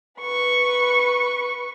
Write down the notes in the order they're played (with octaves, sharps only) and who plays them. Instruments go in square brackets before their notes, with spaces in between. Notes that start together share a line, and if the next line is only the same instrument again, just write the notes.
[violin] B4 C#6